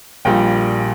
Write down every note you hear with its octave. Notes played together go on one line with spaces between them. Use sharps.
A#1 A#2 G3 G5